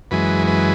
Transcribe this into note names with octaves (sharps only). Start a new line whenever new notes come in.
F#2 E3 G#3 B4
B4